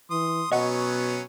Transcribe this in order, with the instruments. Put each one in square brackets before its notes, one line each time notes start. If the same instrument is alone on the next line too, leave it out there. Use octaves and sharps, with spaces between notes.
[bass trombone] E3 [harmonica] C6 D#6
[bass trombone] B2 [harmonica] F#3 B3 C#4 [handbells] D#5 F#5